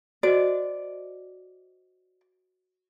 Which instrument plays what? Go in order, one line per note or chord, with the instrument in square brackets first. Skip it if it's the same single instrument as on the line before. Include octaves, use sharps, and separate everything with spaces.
[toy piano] F#4 C5 D#5 [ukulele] D5